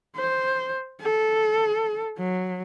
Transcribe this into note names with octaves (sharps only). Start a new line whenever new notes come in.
C5
A4
F#3